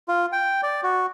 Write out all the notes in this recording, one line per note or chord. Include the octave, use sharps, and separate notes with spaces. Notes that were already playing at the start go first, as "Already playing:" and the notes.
F4
G5
D5
F#4